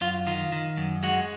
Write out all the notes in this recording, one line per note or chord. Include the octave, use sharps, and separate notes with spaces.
F#2 F4
D#3 F4
D#3
F#2
G#3 F#4